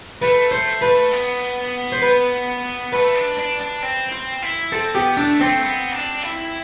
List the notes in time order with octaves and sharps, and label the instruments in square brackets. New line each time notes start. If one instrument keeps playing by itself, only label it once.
[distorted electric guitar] A3 [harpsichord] B4
[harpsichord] C5
B4
[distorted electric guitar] B3
[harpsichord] C5
B4
[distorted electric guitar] A3 [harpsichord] B4
[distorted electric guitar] D4
D4
D4
C4
C4
E4
[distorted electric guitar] C4 [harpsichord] A4
[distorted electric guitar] B3 [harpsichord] G4
[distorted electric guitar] A3 [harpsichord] D4
[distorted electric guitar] A3 [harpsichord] C4
[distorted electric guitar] B3
D4
E4